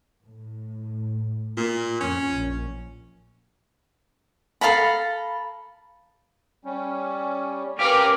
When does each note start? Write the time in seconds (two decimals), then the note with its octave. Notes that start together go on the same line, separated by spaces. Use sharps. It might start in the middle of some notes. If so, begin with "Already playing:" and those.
0.24 A2
1.57 A#2
2.00 F2 C#4
2.32 A#1
4.61 A4 F5 A#5 B5
6.65 G3 C#4
7.79 C#4 G4 A#4 B4 F5 D6